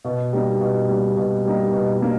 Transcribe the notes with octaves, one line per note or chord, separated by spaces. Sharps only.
B2
G3 A#3 D#4
B2
G3 A#3 D#4
B2
G3 A#3 D#4
B2
G3 A#3 D#4